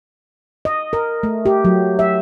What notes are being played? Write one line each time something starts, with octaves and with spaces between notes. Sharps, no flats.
D#5
A#4
A3
G4
F#3
E5